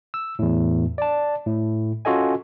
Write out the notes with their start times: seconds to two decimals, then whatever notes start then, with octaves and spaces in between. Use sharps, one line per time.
0.14 E6
0.39 E2 A2
0.98 D5 A5
1.46 A2
2.05 C#4 F4 F#4 A4 D#5 G#5